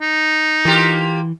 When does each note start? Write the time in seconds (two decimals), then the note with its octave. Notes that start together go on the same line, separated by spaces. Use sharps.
0.01 D#4
0.65 E3 A#3 F4 G4